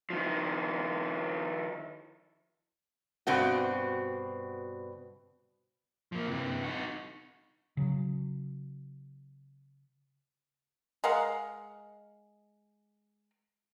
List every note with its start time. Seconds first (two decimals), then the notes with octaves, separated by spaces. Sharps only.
0.10 D#3 F3
3.27 G2 B2 C4 F#4
6.12 F3 A#3
6.27 C3 E3
6.64 D#4 F#4
7.77 C#3 F#3
11.04 G#3 A#4 F5 F#5